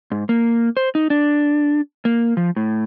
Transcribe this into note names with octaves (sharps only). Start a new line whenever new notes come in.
G#2
A#3
C5
D#4
D4
A#3
F3
A2